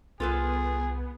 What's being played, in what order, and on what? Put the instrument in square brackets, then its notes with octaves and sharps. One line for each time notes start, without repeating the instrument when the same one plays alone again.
[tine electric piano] C2 [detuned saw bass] B3 [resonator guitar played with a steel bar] F4 A4 B4 [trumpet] G#4